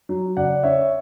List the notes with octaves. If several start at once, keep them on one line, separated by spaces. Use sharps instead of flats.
F#3
C#3 D5 F#5
C#4 C#5 E5